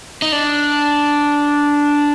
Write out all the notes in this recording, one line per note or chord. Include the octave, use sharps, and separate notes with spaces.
D#4
D4